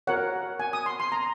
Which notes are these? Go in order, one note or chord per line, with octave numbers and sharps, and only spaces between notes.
F#4 A#4 C#5 F#5
G#5
D#6
C6
C6
A#5